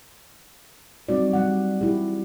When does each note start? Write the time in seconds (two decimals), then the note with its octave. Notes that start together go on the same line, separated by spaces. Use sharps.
1.09 F#3 G3 C4 D#4 F#4 D5
1.33 G3 F#5
1.81 E4 G4